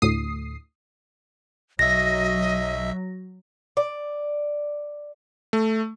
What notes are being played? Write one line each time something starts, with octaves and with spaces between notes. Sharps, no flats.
D2 A2 D#6 C7
B1 F#3 D#5 E5 A#6
D5
A3